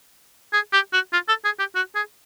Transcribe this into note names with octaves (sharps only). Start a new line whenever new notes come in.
G#4
G4
F#4
F4
A4
G#4
G4
F#4
G#4